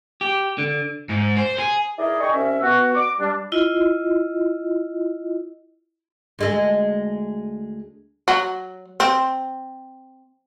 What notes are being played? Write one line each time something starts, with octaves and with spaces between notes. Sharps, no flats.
G4
D3
G#2
C5
G#4
D#4 E4 G#4 A#4 D5 D#5
D#4 D5 D#5 G5 G#5 C#6
C2 C#4 E5
B3 F#4
D6
G3 D4
E4 F4 D#5
D2 G#3 A4
F#3
C4